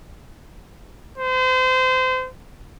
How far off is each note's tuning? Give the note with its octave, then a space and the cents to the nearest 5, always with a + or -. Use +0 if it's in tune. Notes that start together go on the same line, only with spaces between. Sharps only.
C5 -30